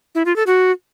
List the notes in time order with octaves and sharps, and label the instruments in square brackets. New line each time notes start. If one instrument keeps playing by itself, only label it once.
[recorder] E4
F4
A4
F#4